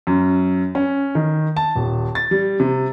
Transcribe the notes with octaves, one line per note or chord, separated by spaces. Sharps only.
F#2
C#4
D#3
A5
D#1
A6
G3
C3